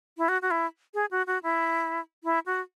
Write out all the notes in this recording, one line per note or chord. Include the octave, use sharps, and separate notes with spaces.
E4
F#4
F#4
E4
G#4
F#4
F#4
E4
E4
F#4